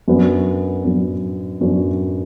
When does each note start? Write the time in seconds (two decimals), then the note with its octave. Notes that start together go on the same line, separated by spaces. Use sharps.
0.08 F#2 F#3 B3 D4
0.85 F#2 F#3 B3 D4
1.61 F#2 F#3 B3 D4